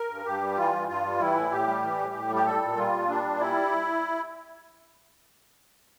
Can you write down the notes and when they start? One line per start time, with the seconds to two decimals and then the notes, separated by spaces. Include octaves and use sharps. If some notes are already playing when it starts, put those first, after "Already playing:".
Already playing: A#4
0.10 G2
0.25 G2 G4
0.41 G3
0.57 E3 F4
0.72 G2
0.88 G2 F4
1.04 G3
1.20 E3 E4
1.35 A2
1.51 A2 G4
1.67 G3
1.83 E3
1.99 A2
2.14 A2
2.30 G3
2.35 G4
2.46 G3 A4
2.61 A#2
2.77 G3 F4
2.93 A#2
3.09 G3 D4
3.25 A#2
3.40 G3 E4